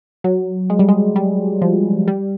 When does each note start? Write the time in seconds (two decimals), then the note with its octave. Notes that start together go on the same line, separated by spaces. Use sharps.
0.24 F#3
0.70 G#3
0.79 G3
0.88 G#3
1.16 G3
1.62 F3
2.08 G3